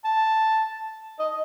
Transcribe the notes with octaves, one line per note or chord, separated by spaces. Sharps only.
A5
D#5